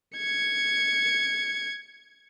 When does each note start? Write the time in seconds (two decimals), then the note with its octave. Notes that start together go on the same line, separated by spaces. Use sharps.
0.18 G#6 C#7